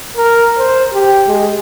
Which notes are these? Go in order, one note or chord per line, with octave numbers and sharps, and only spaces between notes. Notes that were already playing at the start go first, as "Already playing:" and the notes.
A#4
C5
G4
G#3